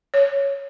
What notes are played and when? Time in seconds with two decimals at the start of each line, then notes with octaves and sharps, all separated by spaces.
0.14 C#5